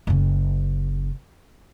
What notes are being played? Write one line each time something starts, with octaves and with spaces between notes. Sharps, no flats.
F#1 C#3